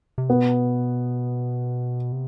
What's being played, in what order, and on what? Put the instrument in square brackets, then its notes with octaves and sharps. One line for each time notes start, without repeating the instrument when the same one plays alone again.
[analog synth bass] C3
[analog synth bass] B2 [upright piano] B3
[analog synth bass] C3